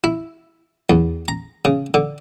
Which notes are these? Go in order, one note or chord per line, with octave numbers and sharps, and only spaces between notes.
E4
E2
A#5
C#3
D3